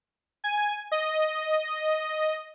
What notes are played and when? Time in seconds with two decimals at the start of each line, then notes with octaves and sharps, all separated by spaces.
0.44 G#5
0.92 D#5